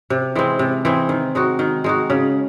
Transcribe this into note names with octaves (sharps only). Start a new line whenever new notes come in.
C3
E3 G#3 C4
C3
E3 G#3 C4
D#3
G#3 D#4 F#4
D#3
G#3 D#4 F#4
C#3